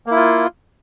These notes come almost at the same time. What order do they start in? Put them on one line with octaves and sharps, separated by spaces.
A#3 E4 F4